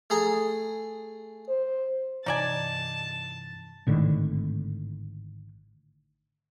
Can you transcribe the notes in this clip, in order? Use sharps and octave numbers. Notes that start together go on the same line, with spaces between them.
A3 G#4 A#5
C5
G2 C3 E3 D#4 D5 G#5 A5
G#1 A2 D3 D#3